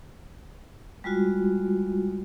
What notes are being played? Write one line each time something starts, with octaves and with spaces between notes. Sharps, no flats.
G3 G#3 F4 F#4